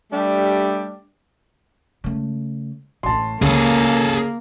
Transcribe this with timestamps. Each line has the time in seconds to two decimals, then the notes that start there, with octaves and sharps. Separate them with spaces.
0.12 G3 A3 D4 G4
2.04 C#3 A3
3.03 A1 A2 A5 C6
3.42 C#2 C#3 F#3 A#3 G#4 A4